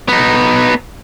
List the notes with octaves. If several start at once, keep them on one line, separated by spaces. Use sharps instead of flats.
B3 D#4